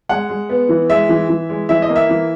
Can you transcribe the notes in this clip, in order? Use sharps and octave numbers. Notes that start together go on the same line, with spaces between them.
G#3 F#5
G#3
B3
E3
G#3 E5
E3
E3
G#3
E3 E5
D#5
A#3
E5
E3